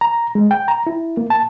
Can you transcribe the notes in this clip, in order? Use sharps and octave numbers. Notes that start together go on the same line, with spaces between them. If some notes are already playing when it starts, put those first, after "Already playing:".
A#5
G#3
G5
A#5
E4
A#3
A5